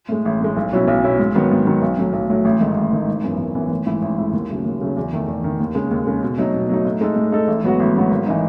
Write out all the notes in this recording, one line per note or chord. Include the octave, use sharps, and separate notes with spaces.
A2 G#3
A1
A2 G#3
B1
B2 F#3 C#4 E4
B1
B2 F#3 C#4 E4
G#2
D#3 F#3 B3
G#2
D#3 F#3 B3
B1
A2 F#3 A3
B1
A2 F#3 A3
A1
G#2 D#3 A3 D#4
A1
G#2 D#3 A3 D#4
G#1
F#2 E3 B3
G#1
F#2 E3 B3
A1
G#2 E3 A3 E4
A1
G#2 E3 A3 E4
D#2
C#3 F#3 A3
D#2
C#3 F#3 A3
E2
D#3 A3
E2
D#3 A3
D#2
C#3 G#3
D#2
C#3 G#3
B2
F#3 A3 D#4
B2
F#3 A3 D#4
A2
G#3 D#4 A4
A2
G#3 D#4 A4
A1
G#2 F#3 B3 F#4
A1
G#2 F#3 B3 F#4
G#1
E3 A3 D#4